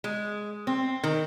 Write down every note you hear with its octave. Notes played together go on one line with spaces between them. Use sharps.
G#3
C4
D#3